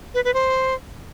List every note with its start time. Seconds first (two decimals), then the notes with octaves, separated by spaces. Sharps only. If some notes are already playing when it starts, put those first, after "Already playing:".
0.14 B4
0.24 B4
0.34 C5